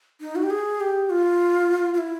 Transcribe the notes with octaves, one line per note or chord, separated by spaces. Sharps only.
D#4
F#4
G4
G#4
G4
F4
F4
E4